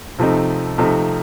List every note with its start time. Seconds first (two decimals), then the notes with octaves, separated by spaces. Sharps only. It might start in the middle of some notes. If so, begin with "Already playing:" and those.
0.18 C3 F3 A3 C4 D#4
0.78 C3 F3 A3 C4 D#4